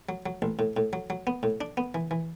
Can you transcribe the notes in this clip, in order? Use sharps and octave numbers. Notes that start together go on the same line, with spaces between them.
F#3
F#3
A1
A2
A2
F#3
F#3
B3
A2
D4
B3
E3
E3